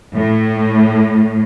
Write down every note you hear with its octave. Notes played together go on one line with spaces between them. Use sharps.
A2